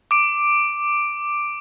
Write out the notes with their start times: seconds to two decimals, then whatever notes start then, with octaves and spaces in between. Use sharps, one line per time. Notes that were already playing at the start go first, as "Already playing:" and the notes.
0.11 D6 D7